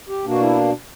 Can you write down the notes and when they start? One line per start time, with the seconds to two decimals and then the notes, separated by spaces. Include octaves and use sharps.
0.09 G4
0.25 B2 A#3 D4 F#4
0.41 E4